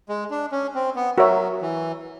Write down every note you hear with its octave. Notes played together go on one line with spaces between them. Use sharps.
G#3
D4
C#4
C4
B3
F#3 F#4 A#4 C#5 E5
E3